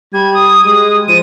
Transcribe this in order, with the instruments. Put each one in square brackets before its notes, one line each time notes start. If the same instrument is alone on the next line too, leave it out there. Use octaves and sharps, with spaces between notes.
[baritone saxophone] G3 [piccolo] G#6
[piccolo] D#6
[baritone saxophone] G#3 [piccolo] D#6
[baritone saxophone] F3 [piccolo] D#7